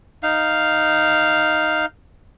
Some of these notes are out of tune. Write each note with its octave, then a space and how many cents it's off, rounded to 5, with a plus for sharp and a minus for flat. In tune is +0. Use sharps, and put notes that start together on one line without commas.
D#4 +0 F5 +0